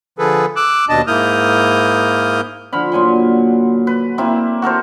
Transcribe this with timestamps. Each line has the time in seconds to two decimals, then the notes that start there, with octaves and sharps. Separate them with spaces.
0.19 D3 F3 G#4 A4 B4
0.56 D6 E6 F#6
0.89 D#2 B2 D4 D#5 A5
1.07 G#2 A#3 E4 D#6 F6 G6
2.73 D3 F3 F5 B5
2.92 A#2 F#3 G#5 C6
3.87 B4
4.18 A#3 C4 E4
4.62 F#4 A4 A#4 C5